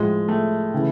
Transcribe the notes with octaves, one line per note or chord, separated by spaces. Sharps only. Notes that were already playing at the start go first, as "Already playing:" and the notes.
Already playing: A2 F3 G#3
A3
C#3 E3